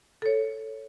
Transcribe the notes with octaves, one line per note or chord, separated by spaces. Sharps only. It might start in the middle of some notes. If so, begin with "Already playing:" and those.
A4 C#5